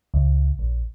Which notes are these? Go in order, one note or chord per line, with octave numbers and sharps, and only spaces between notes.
C#2
A#1